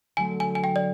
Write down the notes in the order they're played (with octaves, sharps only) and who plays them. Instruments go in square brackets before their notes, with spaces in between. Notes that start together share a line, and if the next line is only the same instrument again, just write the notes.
[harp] D3 F#3 A3 [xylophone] G#5
[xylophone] G#5
G#5
G5
D5